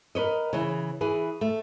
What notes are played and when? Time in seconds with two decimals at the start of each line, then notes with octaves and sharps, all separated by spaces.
0.15 A#4 B4 C#5 D#5
0.53 C#3 E3
1.01 E3 G#4 B4
1.41 A3